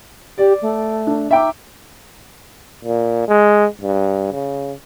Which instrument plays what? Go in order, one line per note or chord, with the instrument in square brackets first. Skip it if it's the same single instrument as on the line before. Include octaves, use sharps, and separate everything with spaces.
[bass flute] G4 [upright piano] D5
[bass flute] A3
[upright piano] D4
[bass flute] D#4 [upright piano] E5 G5 D6
[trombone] A#2
G#3
G2
C#3